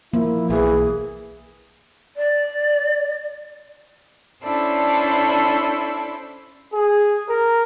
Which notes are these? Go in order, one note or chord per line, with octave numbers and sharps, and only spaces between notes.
F3 A#3 E4
B1 E3 G#4
D5
C#4 D4 E4 A4 C5
G#4
A#4